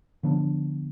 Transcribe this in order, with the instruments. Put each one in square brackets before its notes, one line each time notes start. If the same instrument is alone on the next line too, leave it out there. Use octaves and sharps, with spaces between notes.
[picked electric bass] D3 F3 B3 D4